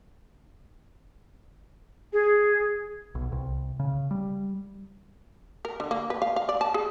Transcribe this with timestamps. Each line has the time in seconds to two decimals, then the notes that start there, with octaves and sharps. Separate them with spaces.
2.13 G#4
3.15 B1
3.32 C2
3.80 C#3
4.11 G3
5.65 A#4
5.80 D3
5.91 A#3
6.10 B4
6.22 F5
6.36 F5
6.49 D5
6.61 A5
6.74 G#4